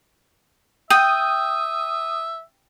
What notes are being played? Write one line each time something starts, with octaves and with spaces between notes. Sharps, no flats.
E5 G5 D#6